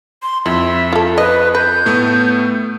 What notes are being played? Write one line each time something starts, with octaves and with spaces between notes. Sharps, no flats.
C6
F2 E4 E5
F4 A4
B4 D#5
B4 G6
A2 A3 B3